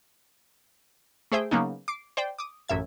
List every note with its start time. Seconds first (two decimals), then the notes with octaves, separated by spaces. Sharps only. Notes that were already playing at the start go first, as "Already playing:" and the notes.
1.32 A3 G#4 C5 E5 G5
1.51 C#3 F#3 A#3 B3 C#4 D#4
1.88 D6 C7 D7
2.17 C5 D5 G5
2.39 D6 D#6
2.68 A1 F#2 E5 G#6